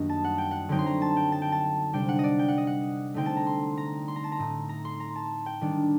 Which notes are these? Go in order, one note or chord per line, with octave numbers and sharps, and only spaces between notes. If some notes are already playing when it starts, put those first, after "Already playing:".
Already playing: F#2 D#3 G3 A#3 D4 D#5
A5
F#5
G5
F#5
D3 F#3 C4 D#4 G5
C6
A#5
A5
G5
A5
G5
A5
C3 G3 D4 G5
F#5
D#5
D5
G5
F#5
D#5
F#5
D3 A3 C4 D#4 G5
A5
A#5
C6
A#5
C6
A#5
A5
A#5
A2 A3 D#4
A#5
C6
A#5
A5
G5
D#3 G3 D4